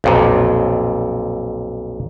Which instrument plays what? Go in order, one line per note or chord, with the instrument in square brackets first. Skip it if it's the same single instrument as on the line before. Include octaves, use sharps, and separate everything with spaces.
[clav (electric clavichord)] B1 F2 A#2